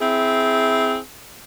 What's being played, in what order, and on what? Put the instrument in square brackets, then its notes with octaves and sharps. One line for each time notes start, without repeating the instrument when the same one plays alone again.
[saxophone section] C4 E4 G#4